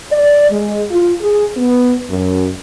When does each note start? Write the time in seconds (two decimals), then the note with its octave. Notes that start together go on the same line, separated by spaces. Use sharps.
0.11 D5
0.50 G#3
0.90 F4
1.21 G#4
1.57 B3
2.09 F#2